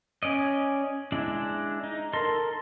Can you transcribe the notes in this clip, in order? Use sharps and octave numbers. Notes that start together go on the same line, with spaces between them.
C#4 D5 D#5
G#3 D4 E4
D#4
A4 A#4 C6